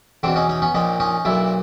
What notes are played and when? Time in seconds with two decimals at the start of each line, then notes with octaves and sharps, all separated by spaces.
0.23 E2 B2 C4 D4
0.36 C#4 D#4
0.49 C#4 D#4
0.62 B3 C#4
0.74 A#1 A#2 C#4 D#4
1.00 C#4 D#4
1.25 B1 A#2 D4 E4